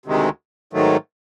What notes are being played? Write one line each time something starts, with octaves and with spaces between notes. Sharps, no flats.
D2 C3 D#3 G#3
G#2 D#3 F#3 A3